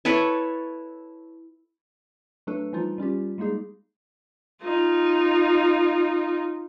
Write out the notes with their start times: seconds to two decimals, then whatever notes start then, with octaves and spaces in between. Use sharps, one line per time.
0.05 E4 A4 B4 C#5
2.47 F#3 A3 D4 A4 B4
2.73 E3 F3 G3 D#4 F4
2.98 G3 C#4 F4 G4
3.38 G3 G#3 A#3 D#4 G#4
4.63 D#4 F4